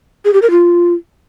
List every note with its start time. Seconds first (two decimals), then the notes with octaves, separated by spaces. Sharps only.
0.25 G#4
0.33 G4
0.42 A#4
0.51 F4